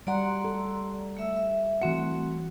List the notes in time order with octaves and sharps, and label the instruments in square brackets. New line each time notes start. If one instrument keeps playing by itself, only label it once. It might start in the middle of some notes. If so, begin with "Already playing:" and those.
[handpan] G3 F#5 [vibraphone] D5 A#5 C6
[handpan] A4
[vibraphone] A3 E5 E6
E5
[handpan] E3 F#4 F#5 [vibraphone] A3 C4